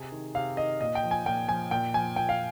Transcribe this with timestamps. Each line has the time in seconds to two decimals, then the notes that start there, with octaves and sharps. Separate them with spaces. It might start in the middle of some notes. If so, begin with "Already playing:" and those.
Already playing: C3 G#4
0.12 D#3
0.35 C3 F5
0.57 D#3 D#5
0.81 A#2 D#5
0.95 G5
1.04 F3
1.11 G#5
1.26 A#2 G5
1.49 F3 G#5
1.71 A#2 G5
1.94 F3 G#5
2.16 A#2 G5
2.29 F5